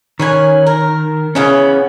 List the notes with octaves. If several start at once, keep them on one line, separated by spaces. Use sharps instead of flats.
D#3 C#4 B4 G#5
A#4
C#3 E3 B3 C#4